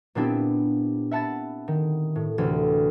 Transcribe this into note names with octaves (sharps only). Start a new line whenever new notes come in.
A#2 B3 C4 D4 E4 G4
E5 F#5 A5 B5 A6
D#3
A2
D2 C3 E3